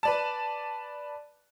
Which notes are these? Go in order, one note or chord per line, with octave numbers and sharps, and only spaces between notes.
B4 D5 A5